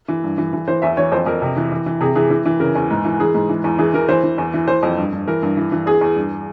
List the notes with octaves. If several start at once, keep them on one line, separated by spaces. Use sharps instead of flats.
E3
G2
E3
E3
E3 C5
E2 E5
E3 C#5
F2 C5
F2 A#4
C3
E3
E3
E3
C3 G#4
E3 G#4
E3
E3
C#3 A#4
E2
G#2
E3
E3 G#4
G#2
E3
E2
E3 G#4
E3 A#4
E3 C5
E3
E2
E3
E3 C5
F2
G2
G2
E3 A#4
G2
E3
E3
E2 G#4
E2
G2